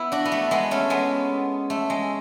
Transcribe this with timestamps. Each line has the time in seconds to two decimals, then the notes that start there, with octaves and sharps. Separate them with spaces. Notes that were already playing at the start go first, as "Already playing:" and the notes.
Already playing: B3 E4
0.12 D4 F#4
0.25 B3
0.32 A3
0.51 G#3 B3
0.71 A3 C#4
0.90 G#3 B3
1.70 A3
1.90 G#3